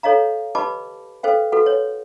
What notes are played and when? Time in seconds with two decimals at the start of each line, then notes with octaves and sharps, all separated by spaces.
0.03 A4 C#5 D#5 F5 A#5
0.55 G4 B4 D#5 A5 B5 D6
1.23 A4 B4 C5 F5 G5
1.52 F#4 A4 B4 F#5
1.66 C#5